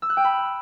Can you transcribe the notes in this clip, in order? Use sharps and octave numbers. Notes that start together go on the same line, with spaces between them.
E6
F#6
G5
B5